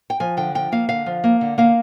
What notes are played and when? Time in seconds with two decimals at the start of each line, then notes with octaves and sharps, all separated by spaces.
0.10 G5
0.20 F3 G#5
0.37 D3 G5
0.55 F3 G5
0.72 A#3 F5
0.89 D3 F5
1.06 F3
1.24 A#3
1.41 D3
1.58 A#3 F5